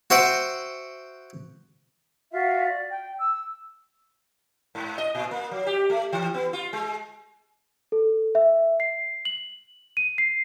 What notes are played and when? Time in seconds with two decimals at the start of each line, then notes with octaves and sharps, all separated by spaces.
0.10 F#4 C5 E5 F#5 G5
2.32 F4 F#4 E5 F5
2.67 D5
2.91 G5
3.18 E6
4.75 G#2
4.98 D#5
5.15 A#2
5.31 A#3
5.51 F#3
5.67 G4
5.90 A3
6.13 E3
6.34 B3
6.53 F4
6.73 G#3
7.92 A4
8.35 E5
8.80 C7
9.25 F#7
9.97 D#7
10.18 C7